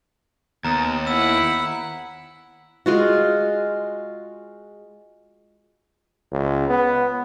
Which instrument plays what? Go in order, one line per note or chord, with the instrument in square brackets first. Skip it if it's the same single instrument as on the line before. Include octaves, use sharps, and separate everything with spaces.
[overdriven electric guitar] D#2 [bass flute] B3 [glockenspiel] A#5
[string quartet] E4 F#5 B5 [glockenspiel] E6
[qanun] G#3 F4 F#4
[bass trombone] C#2
B3